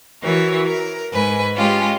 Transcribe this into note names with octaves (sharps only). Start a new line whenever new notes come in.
E3 F#4 A#4 C#5
A#4
G#2 B4 G#5
G#3 C#4 F4 G4